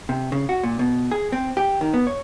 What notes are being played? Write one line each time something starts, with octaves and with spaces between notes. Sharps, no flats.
C3
C#3
F#4
A#2
B2
G#4
C4
G4
D#3
B3
C#5